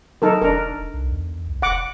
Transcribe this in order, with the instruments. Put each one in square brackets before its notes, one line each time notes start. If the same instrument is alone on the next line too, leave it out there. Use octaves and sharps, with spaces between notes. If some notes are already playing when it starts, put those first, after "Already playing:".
[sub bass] F#3 [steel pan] D#4 A4 A#4
[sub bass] E1 [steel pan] D4 A#4
[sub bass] C2
E2
C#2
[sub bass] E1 [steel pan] F#5 D6